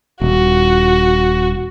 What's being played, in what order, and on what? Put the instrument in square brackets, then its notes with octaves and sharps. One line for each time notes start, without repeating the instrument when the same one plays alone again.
[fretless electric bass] D#1 [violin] F#4